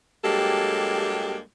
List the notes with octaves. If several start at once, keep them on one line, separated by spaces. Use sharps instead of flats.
G2 F#3 G#3 A#3 G4 A4